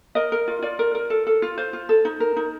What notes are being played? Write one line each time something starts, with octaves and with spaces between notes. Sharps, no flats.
A#4 D#5
A#4
F4
F4 D5
A#4
A#4
A4
A4
F4
F4 C5
F4
A4
D#4
A#4
D#4